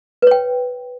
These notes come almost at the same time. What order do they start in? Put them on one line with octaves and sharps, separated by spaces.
B4 C#5 G5